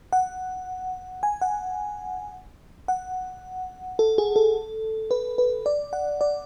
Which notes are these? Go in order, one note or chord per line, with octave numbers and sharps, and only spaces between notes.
F#5
G#5
F#5
F#5
A4
G#4
A4
B4
B4
D5
F#5
D5